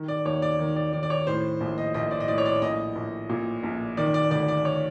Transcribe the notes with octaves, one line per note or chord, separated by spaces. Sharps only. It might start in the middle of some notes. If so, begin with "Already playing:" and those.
Already playing: D#3
D5
D#2 C#5
D5
D#3
D5
D#3 D5
D5
C#5
A2 C5
A#1
D#5
A#1 D#5
D5
D#5
A2 D5
C#5
D5
A#1 D#5
A#1
A#2
A#1
D#3 D5
D5
D2 D5
D5
C#5